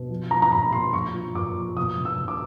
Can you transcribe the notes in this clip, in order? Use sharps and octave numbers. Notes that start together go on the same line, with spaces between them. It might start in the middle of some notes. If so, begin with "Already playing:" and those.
Already playing: B2
F3
F3 A#5
A#5
A#2 B5
A#2 C6
F3 C#6
F3
A#2 D6
F3
B2 D#6
B2
E6
B2
D6